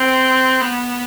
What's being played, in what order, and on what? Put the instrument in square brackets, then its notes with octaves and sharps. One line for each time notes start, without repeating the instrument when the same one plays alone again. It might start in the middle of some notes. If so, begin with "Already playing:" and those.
Already playing: [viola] C4
B3